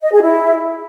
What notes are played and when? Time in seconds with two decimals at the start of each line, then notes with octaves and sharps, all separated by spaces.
0.01 D#5
0.12 G#4
0.22 E4